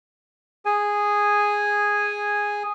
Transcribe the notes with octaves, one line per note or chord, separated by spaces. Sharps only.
G#4 G#5